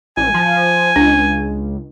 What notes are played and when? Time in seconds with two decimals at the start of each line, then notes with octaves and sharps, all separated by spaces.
0.17 A1 G#5
0.34 F3
0.96 C#2 D4